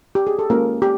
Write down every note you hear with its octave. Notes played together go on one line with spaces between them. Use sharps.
G4
G#4
A4
G#3 A#3 C#4 F4 A#4
G4